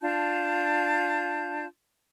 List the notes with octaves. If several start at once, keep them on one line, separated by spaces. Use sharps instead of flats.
D4 F4 A5 G6